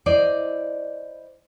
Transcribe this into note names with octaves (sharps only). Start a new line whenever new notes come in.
E4 C5 D5 D#5